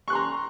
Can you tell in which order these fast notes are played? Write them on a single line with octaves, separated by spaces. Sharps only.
C#6 F#6 C6 A#5